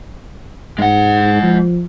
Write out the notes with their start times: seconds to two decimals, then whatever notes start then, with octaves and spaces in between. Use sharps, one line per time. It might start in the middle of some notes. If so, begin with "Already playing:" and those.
0.79 G#2 G#3 F#5
1.43 F3